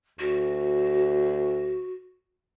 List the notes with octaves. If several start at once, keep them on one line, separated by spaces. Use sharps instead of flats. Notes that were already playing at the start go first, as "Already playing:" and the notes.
D2 F#4